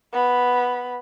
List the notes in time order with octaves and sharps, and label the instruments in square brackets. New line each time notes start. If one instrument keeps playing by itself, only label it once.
[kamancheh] B3 B5